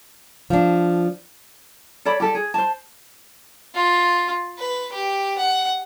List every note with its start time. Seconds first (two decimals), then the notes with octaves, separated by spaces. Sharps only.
0.50 F3 D4
2.05 A4 C#5 D5 B5
2.20 G4 A4 D5
2.35 G#4
2.54 C5 A5
3.75 F4
4.58 B4
4.92 G4
5.38 F#5